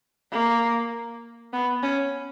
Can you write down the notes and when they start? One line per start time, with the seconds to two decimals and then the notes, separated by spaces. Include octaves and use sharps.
0.32 A#3
1.53 B3
1.83 C#4